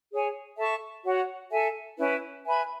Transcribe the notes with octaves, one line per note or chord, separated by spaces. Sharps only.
G#4 C#5 G#5
A4 E5 A5 C#6
F#4 C#5 F#5
A4 E5 G#5
C#4 E4 B4
B4 E5 G#5 B5